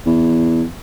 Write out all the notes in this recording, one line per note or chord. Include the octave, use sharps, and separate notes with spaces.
E2